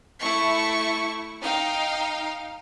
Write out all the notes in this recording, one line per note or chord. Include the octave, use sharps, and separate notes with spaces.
A3 E4 C#6
D#4 F5 G5